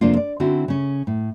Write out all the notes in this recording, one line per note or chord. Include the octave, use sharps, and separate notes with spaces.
F2 C3 A#3 D4 F4
D5
D3 C4 C#4 E4 F#4
C#3 C#4
A2